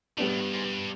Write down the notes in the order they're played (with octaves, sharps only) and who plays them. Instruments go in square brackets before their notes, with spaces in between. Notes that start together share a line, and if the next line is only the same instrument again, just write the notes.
[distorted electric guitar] A2 [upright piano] G3 B3 D4
[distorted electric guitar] A2
G2
G#2
G2